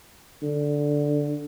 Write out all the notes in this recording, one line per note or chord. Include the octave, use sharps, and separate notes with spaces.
D3